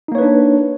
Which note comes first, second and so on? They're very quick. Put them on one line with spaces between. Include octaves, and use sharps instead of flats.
D#4 A#3 C#5 B4 D4